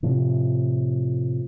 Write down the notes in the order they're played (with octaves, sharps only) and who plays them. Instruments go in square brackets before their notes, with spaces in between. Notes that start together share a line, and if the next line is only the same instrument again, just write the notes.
[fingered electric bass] A2 C3 F3